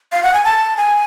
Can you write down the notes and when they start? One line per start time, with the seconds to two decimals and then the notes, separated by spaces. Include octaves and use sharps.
0.12 F5
0.23 F#5
0.33 G#5
0.45 A5
0.77 G#5